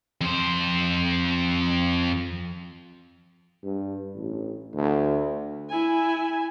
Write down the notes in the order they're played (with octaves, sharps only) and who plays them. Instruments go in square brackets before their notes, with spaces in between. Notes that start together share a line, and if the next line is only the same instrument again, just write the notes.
[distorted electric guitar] F2 C5
[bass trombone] G2
A1
D2
[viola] E4 G#5